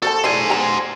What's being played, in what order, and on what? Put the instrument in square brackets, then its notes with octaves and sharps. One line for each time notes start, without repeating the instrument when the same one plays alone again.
[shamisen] F#4 C5 A5 [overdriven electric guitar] A4
[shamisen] C#3 E3 G3 [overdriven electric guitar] C5 G#5
[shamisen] B4 G5 A#5